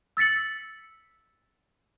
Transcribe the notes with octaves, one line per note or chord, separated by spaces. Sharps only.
E6 A6 B6 C#7 F#7